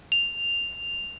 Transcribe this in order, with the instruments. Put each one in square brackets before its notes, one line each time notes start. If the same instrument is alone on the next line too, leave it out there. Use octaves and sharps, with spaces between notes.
[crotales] F7